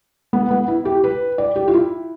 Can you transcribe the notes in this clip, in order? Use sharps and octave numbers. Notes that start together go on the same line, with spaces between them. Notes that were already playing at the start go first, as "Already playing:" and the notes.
B3
B3
E4
G4
B4
D5
G4
F4
E4